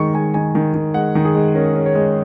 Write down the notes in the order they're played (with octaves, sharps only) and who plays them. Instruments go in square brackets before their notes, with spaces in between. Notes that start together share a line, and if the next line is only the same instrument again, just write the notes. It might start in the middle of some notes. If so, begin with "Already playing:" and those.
Already playing: [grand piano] D#3 G#3 C#6
G#3 G#5
D#3 G#5
D#3
D#3
G#3 F#5
D#3
G#4
G#3
C#4 A#4
C#4
C#5
G#3